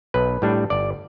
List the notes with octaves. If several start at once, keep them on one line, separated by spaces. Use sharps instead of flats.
B1 B4
A2 G3 D4
G1 D5